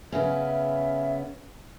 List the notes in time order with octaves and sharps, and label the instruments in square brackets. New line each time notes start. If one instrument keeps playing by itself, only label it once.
[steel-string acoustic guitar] C#3 B3 C#4 [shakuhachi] E5